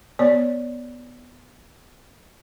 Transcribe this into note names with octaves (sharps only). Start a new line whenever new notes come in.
B3 C#5 D5